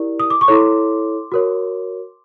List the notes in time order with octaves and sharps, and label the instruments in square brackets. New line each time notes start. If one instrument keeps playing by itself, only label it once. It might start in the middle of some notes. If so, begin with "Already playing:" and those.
Already playing: [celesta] E4 G4 A#4 D5
D#6
D6
C#6
E4 A4 C#5 C6 D6
F#4 A#4 C#5